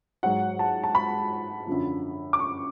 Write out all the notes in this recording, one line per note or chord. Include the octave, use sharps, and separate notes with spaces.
G#2 F#3 F#5
A5
A5
B5
F#2 D3 F3
D6
C#6